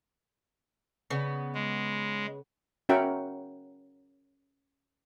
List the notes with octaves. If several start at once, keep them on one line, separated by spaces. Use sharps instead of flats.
C#3 B3
G#3
C#4 F#4 A#4 E5 F#5 G5